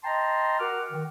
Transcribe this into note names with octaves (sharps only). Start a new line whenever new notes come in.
D#5 G5 A5 A#5 C6
F#4 A#4 F#5 D6 F6
D#3